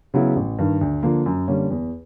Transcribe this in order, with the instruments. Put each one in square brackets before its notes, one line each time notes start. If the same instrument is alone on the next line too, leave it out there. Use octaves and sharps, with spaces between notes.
[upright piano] C#3 F#3 B3 E4
A1
G2 D#3
D2
D3 F3 A#3
F#2
D3 G3 A#3 C#4
E2